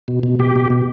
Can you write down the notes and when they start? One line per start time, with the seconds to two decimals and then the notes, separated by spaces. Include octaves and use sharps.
0.08 B2
0.23 B2
0.39 B2 G4
0.56 B2
0.70 B2